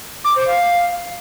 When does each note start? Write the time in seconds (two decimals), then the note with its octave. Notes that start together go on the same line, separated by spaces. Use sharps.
0.24 D6
0.36 C5
0.47 F5